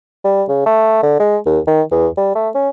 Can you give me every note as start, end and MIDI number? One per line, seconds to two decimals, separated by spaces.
0.25 0.43 55
0.49 0.66 49
0.66 1.01 57
1.03 1.15 50
1.20 1.37 56
1.46 1.59 39
1.67 1.82 51
1.91 2.07 40
2.17 2.34 55
2.35 2.49 57
2.54 2.69 61